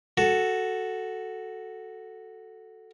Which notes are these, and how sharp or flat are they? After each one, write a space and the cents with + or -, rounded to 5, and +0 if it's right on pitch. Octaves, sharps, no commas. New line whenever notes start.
F#4 +0 A4 +0